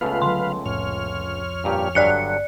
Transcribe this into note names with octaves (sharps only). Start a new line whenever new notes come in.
C#2 A3 B3 F4 B4 F5
D3 F#3 C6
C2 F2 A2 C#5 F6
G2 A#2 G4
G1 G2 D3 F#3 D5 F#6 C#7